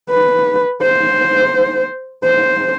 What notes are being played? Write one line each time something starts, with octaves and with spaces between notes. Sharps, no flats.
B4
C5
C5